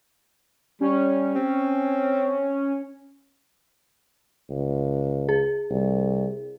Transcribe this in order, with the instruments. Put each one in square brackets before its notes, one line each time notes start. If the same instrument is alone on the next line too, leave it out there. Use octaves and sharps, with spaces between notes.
[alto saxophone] G3 [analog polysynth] C#4
[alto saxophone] C4
[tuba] C#2
[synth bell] G#4
[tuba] C2